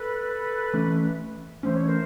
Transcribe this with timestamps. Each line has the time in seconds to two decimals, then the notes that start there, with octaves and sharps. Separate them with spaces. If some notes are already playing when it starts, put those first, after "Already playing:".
Already playing: A4 B4
0.73 E3 A3 C#4
1.63 E3 A3 C#4 C5
1.74 C#5
1.86 A#4 C5